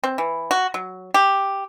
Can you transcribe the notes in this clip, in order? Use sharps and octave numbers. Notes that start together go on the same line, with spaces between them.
C4
E3
F#4
F#3
G4